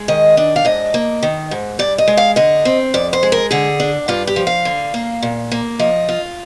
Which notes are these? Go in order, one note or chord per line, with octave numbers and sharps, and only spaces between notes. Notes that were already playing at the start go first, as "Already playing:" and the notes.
Already playing: G#3
D#3 D#5
D4
F5
G#2 D#5
A#3
D#3
G#2
G2 D5
D#5
G#3
F5
D3 D#5
C4
F2 D5
C5
G#3
A#4
D3 G#4
D4
G2 F4
G4
F3
F5
D3
A#3
A#2
A#3
F3 D#5
F4